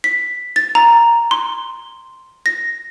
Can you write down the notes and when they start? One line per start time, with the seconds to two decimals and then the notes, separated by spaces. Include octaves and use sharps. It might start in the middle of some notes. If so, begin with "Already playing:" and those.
0.04 B6
0.56 A6
0.75 A#5
1.31 C6
2.46 A#6